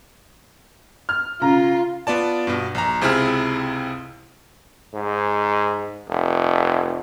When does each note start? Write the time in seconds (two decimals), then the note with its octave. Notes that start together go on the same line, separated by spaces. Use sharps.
1.09 F6
1.41 C#3 F4 A#5
2.07 B3 F4 D5 A5
2.47 G2 B2
2.75 A#1 A#5
3.01 C#2 C3 C4 E4 G#4 F6
4.94 G#2
6.08 F1